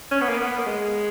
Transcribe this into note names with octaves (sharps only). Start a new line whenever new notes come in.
C#4
B3
A#3
B3
A#3
G#3